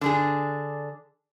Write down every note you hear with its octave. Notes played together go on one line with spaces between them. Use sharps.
D3 D4 G#4